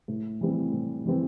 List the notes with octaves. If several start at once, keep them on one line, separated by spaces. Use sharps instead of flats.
A2
E3 G3 C4
A2
E3 G3 C4